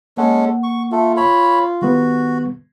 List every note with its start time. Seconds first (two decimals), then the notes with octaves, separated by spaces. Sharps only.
0.17 G#3 A#3 C#4 A4 F#5
0.63 C#6
0.92 A3 F4 A4
1.17 C#5 B5
1.82 D#3 G3 B3 F#4